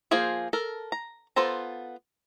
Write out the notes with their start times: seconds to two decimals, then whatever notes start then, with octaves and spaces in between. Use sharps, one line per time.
0.11 F3 A#3 F4 G#4 C5
0.53 A4 A#4
0.92 A#5
1.36 B3 F4 A4 C5 A#5